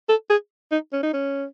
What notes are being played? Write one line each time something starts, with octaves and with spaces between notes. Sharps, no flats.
A4
G#4
D#4
C#4
D#4
C#4